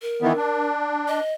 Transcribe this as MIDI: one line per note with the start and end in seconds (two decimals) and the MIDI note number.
0.02 0.68 70
0.22 0.33 51
0.22 0.33 52
0.22 0.33 59
0.36 1.20 62
1.08 1.33 75